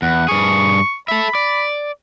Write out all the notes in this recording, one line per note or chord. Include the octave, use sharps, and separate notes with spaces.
E2 F#5
G2 G#4 C#6
A4 E5 B5
D5